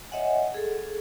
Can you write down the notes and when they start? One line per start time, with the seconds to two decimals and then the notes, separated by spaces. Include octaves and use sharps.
0.11 C#5 D#5 E5 F#5 G#5
0.54 G#4 A4